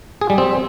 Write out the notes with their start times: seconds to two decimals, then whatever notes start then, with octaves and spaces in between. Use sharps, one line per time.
0.21 G#4
0.30 G3
0.38 C4